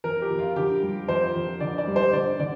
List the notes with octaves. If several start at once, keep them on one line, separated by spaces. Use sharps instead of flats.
F2 A#4
G4
F2
F4
D3 G4
G3
F2 C5
F2
D3 D5
D5
G3
C5
D3 D5
D3 D5